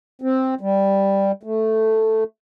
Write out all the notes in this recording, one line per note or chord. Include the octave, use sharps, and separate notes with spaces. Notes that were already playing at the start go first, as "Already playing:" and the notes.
C4
G3
A3